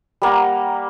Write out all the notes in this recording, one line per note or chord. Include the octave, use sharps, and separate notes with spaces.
G3 A#3 F#5 A#5